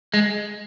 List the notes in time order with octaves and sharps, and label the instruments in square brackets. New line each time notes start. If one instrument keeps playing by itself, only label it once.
[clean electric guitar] G#3